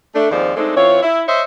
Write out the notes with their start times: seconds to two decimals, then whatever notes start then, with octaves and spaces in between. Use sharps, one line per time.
0.15 A3 D4
0.31 D#2 G#2 F3 C4 F4 D5
0.56 G#3 A3 C4 D4 D#4 A4
0.76 E3 C4 F4 C#5
1.03 E4
1.28 C5 C#5 D#5 E5